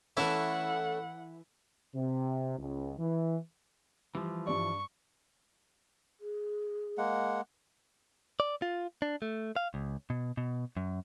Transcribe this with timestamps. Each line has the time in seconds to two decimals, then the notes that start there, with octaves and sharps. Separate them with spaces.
0.17 E3 A3 C#4 E4 A4 F#5
1.94 C3
2.58 C#2
2.99 E3
4.15 E3 F3 G3
4.47 G2 G3 D5 C#6
6.21 G#4
6.98 G#3 A#3 F#5
8.40 D5
8.62 F4
9.02 D4
9.22 A3
9.56 F5
9.74 C#2
10.10 B2
10.37 B2
10.77 F#2